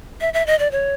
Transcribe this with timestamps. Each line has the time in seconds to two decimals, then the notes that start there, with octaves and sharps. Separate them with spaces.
0.21 E5
0.34 E5
0.46 D#5
0.59 D5
0.71 C#5